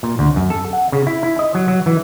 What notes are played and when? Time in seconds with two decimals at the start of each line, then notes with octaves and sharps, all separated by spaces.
0.03 A#2
0.19 D2
0.36 F#2
0.50 A4
0.73 F#5
0.92 C#3
1.07 E4
1.23 E4
1.39 D#5
1.55 F#3
1.68 F#3
1.86 E3